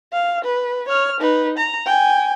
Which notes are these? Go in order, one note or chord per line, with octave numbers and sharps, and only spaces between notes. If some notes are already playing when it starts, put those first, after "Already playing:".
F5
B4
C#5 F6
D#4 B4
A#5
G5 G#5